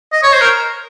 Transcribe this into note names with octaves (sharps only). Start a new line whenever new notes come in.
D#5
C#5
C5
A#4